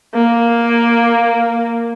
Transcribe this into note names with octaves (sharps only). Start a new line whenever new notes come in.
A#3